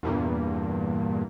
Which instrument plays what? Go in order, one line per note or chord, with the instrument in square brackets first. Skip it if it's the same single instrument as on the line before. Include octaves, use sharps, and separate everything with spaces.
[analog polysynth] E2 G2 A#2